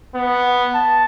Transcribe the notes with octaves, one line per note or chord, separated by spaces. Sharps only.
B3
A5